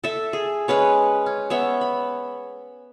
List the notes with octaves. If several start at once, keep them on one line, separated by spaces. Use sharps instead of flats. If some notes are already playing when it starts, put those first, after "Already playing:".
A4 E5
G#4
G#3 C#4 B4 C#5
C#4
B3 C#5 E5
B5